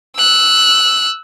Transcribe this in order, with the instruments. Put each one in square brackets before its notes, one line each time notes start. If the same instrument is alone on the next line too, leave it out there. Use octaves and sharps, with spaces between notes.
[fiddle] E6 F#6